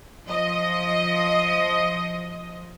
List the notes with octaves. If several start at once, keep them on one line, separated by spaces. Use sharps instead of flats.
F3 D#5